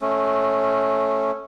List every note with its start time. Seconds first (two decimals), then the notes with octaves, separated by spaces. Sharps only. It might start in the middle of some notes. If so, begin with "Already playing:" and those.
0.01 A3 C#4